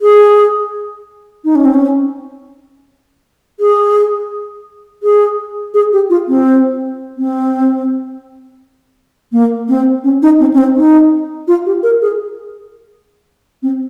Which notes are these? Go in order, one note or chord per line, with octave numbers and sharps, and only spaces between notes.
G#4
D#4
C#4
C4
C#4
G#4
G#4
G#4
G4
F4
C4
C4
A#3
C4
C#4
D#4
C4
C#4
C4
D#4
F4
G4
A#4
G#4
C4